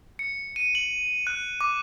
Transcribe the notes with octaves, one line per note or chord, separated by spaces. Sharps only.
C#7
D#7
F#7
F#6
D6